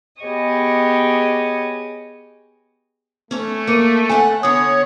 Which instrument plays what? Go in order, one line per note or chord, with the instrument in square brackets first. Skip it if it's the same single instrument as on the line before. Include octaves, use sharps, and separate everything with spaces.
[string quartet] B3 G4 G#4 C#5 D#5
[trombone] A3 [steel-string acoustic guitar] C#4 C#5
[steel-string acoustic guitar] A#3 [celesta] C#7 D#7
[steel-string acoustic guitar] A4 E5 F#5 [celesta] G#5
[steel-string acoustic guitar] D3 B3 [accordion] C#5 [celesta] D#6